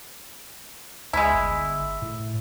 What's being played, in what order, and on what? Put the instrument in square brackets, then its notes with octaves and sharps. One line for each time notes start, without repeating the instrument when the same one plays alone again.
[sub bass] C#2 [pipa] G#3 E4
[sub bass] G1
A2